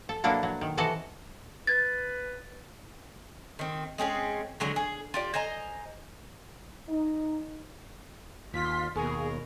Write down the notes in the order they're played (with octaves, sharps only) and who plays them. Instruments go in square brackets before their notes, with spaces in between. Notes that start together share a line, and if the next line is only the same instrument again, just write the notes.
[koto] A4
B2 F#3 A#3 D4 E4 A4
F#3
D#3
C3 E3 F#4 A4 D#5 A5
[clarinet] B4 [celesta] G#6 A6
[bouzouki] D#3 C4
G#3 C4 C#4 G#4
D3 F#3 G#3
G#4
F4 G4 D5
C5 D#5 G#5 A#5
[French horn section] D#4
[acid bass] D#2 [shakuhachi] F4 [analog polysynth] C6 B6
[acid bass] D#2 [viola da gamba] B2 A#4 [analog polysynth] G#4 [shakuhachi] C#6